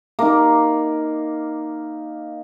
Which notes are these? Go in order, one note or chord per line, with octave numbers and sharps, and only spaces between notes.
A#3 D#4